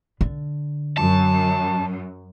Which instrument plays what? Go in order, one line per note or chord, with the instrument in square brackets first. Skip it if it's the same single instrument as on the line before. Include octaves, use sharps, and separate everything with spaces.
[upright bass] D3
[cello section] F#2 [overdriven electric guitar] A5